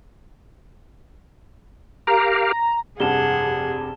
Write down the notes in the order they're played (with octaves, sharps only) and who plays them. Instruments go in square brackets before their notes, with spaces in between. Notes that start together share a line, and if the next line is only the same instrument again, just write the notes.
[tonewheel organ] G4 A#4 F5 [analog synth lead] A#5
[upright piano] F1 G2 C3 [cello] G#4 [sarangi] F#5 [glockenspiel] A5 E7 G7